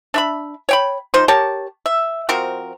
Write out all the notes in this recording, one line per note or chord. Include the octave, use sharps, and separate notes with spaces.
D4 E5 B5
C#5 G5 B5
F3 D#4 C5
G4 A#4 C#5 A5
E5
F3 C4 F#4 A#4